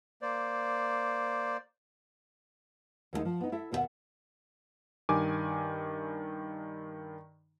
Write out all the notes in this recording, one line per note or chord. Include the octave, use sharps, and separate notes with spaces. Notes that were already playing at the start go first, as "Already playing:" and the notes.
A#3 C5 D5
D#2 G3 G#3 D#4
F3
B3 D#4
E4 A4 E5
D#2 B2 E4 G#4 E5 F#5
G2 D#3 G#5 D6